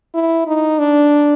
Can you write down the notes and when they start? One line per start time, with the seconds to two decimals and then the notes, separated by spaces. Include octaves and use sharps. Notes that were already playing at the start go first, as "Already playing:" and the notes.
0.14 E4
0.47 D#4
0.79 D4